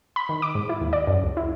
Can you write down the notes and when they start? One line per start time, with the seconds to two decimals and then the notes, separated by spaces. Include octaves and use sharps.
0.16 B5
0.29 D#3
0.42 D6
0.55 G#2
0.69 E4
0.81 D#2
0.93 D5
1.07 F#2
1.24 C#2
1.37 E4